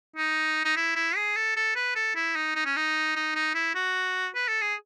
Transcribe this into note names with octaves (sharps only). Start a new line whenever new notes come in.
D#4
D#4
E4
E4
G#4
A4
A4
B4
A4
E4
D#4
D#4
C#4
D#4
D#4
D#4
E4
F#4
B4
A4
G#4